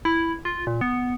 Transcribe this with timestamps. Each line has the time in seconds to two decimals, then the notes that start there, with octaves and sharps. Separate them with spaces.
0.05 E4
0.45 F4
0.67 A#2
0.81 B3